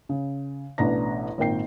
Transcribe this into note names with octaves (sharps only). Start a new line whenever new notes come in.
C#3
A1 B2 D4 B4 A#5 A#6
G#1 A#2 A#4 G5 C7